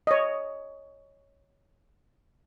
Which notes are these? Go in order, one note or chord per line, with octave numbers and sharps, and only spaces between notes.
C#5 D#5